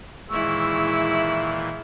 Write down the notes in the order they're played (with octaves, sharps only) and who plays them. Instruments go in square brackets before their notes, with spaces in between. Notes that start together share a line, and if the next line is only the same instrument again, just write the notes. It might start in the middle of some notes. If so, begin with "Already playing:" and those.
[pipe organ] A#2 D#3 E3 [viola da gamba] G#3 E4 [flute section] C#6 E6